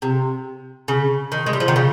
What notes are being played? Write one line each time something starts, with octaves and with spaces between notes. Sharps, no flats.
C3
C#3
D#3
G#3
G3
F3
D#3
C#3